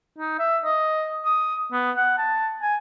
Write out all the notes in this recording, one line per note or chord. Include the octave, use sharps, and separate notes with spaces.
D#4
E5
D#5
D#6
B3
F#5
A5
G#5